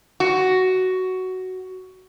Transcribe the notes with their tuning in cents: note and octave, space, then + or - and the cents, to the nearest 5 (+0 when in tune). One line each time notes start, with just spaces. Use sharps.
F#4 +10